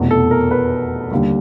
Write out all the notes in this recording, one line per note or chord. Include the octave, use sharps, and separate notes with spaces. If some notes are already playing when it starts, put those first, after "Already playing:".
Already playing: F1 E2 B2
A4
A#4
B4
D#2 D3 G3